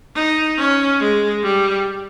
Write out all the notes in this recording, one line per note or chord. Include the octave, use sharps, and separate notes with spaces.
D#4
C#4
G#3
G3